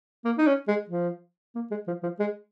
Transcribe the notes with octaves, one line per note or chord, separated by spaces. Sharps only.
A#3
D#4
C#4
G#3
F3
A#3
G#3
F3
F3
G#3